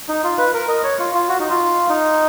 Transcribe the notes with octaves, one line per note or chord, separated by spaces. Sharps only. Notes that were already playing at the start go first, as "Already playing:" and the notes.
D#4
F4
B4
A#4
D#5
C#5
F4
F4
F#4
D#4
F4
D#4